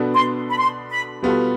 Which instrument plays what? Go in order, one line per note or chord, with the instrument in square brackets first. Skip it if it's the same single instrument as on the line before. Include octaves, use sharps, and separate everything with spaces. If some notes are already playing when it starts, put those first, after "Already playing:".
Already playing: [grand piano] B2 B3 D4 A4
[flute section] C6
B5
C6
B5
[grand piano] B2 G3 B3 F4 A4